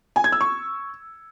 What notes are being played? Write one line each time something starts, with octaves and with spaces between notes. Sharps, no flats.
G#5
G#6
E6
C#6